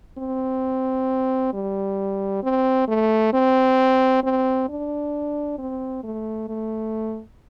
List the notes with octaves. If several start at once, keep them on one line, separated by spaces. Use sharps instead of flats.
C4
G3
C4
A3
C4
C4
D4
C4
A3
A3